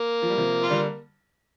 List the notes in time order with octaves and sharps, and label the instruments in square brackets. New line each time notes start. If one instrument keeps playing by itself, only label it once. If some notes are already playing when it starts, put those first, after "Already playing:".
Already playing: [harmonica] A#3
[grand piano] F3
G3
C3 F3
[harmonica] F4
[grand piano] D3 G3